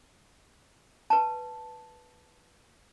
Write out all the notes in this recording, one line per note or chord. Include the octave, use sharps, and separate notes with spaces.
B4 A5